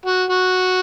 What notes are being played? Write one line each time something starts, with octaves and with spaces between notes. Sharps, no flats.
F#4
F#4